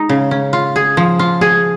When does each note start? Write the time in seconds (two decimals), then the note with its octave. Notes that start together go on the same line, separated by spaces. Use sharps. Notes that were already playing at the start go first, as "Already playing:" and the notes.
Already playing: G#3 D#4
0.09 C#3
0.31 C#4
0.53 F4
0.76 G#4
0.97 F3
1.19 F4
1.41 G#4